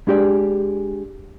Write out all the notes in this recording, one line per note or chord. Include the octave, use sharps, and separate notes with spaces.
G#3 D4 G4 G#4 D5